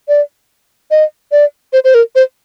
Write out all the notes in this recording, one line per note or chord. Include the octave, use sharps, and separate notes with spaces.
D5
D#5
D5
C5
C5
A#4
C5